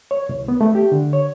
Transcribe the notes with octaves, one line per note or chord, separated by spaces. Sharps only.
C#5
C2
B3
A3
G4
D3
C#5